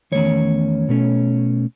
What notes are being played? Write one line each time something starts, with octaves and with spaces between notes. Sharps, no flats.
E2 D#3 A3 C#4 C#5
B2 A3 C#4